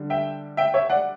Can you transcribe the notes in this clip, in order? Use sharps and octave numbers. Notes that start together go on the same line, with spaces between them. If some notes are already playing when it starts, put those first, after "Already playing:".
Already playing: D3 G3
E5 G5
E5 G5
C#5 E5
D5 F#5